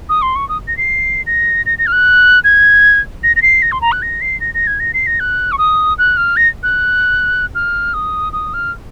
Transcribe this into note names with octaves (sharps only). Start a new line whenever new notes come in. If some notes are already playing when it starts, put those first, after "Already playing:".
D#6
C6
C#6
D#6
A#6
C7
A#6
A#6
A#6
F6
F#6
G#6
A#6
A#6
C7
A#6
C6
A#5
F#6
A#6
C7
A#6
A#6
G#6
A#6
C7
A#6
F#6
C#6
D#6
F#6
F6
A#6
F#6
F6
D#6
D#6
F6